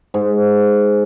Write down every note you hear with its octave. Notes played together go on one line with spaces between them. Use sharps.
G#2